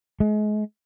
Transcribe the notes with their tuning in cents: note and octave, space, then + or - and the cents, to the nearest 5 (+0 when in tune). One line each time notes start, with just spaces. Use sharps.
G#3 +35